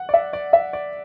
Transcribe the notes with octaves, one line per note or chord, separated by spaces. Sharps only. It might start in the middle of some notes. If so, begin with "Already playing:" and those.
Already playing: F#5
D5
E5
D5
E5
D5